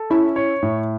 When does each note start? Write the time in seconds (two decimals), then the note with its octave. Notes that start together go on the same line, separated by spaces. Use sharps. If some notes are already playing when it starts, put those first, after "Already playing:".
Already playing: A4
0.10 C#4 E4
0.36 C#5
0.63 A2